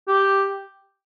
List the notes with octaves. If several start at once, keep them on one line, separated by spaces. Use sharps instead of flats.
G4